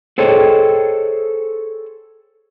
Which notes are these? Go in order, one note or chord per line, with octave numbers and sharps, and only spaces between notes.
G#4 A4 C5 C#5 D#5 G5